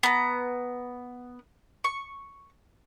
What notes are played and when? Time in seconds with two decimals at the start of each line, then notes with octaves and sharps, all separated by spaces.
0.03 B3 A#5
1.84 C#6